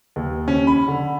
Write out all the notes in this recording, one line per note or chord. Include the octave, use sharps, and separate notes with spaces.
D#2
C#4
B5
D3